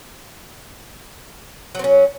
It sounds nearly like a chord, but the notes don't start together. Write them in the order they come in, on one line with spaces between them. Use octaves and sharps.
F#3 C4 C#4